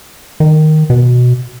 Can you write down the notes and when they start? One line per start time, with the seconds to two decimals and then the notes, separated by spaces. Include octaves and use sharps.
0.40 D#3
0.90 B2